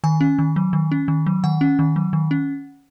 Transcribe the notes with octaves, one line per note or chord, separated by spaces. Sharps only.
D#3 G#5
C#4
D#3
F#3
D#3
C#4
D#3
F#3
D#3 F#5
C#4
D#3
F#3
D#3
C#4